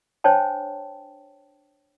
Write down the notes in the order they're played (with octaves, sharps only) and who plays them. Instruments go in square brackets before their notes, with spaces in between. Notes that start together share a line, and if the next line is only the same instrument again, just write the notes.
[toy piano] D4 C5 C#5 G5 A5